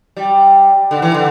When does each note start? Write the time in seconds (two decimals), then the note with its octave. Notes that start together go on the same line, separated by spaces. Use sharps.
0.17 G3
0.91 D3
1.02 E3
1.14 D3